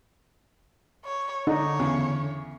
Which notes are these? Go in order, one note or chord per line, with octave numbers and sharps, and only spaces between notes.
C#5
D3 D#4 C#5
E2 C#3